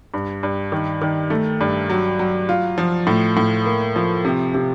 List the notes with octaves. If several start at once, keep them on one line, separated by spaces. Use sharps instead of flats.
G2
G2
D#3
D#3
A3
G2
F#3
F#3
F4
F3
A2
A2
A#3
F3
C3
C3